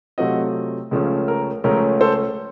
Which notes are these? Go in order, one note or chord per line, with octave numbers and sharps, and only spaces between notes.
C3 F#3 A3 C4 F4 D#5 F#5
C#2 C#3 F3 A3 C#4
A#4
C#2 C#3 F3 A3 C#4 A#4
A4 C5